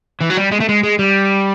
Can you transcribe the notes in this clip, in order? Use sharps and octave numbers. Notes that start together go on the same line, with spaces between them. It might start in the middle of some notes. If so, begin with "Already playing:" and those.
E3
F#3
G3
G#3
A3
G#3
G#3
G3